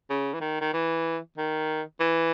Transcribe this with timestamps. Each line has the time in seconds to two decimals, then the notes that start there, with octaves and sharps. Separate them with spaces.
0.10 C#3
0.34 E3
0.41 D#3
0.61 D#3
0.74 E3
1.38 D#3
2.00 E3